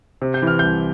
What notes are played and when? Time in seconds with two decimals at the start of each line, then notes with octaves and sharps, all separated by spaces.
0.22 C3
0.34 G6
0.42 E3 F6
0.59 C2 G6